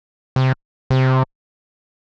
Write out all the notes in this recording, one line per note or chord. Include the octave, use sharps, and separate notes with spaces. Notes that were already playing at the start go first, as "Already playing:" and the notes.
C3
C3